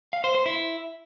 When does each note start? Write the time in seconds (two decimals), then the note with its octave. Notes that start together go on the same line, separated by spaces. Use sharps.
0.13 F5
0.24 C5
0.35 C5
0.46 E4